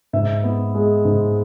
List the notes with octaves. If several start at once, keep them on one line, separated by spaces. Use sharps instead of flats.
G#2 E5
B3
G#3
G#2